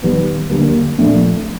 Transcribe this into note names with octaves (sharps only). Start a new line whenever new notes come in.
D#3 G3 B3
D3 G3 A#3
A#2 F3 A3 D4